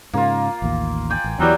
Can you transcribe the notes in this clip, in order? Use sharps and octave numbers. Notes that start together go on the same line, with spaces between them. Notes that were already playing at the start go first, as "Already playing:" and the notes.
G#2 C#3 A#3 F4
A1 D#2
D5 G5 G#5
A1
E2 E3 F#3 G3